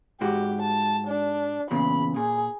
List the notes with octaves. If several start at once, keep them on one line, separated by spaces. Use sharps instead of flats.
G#2 G#3 F#4 G4
A5
D4
E2 A#2 C#3 B5
A#2 G#4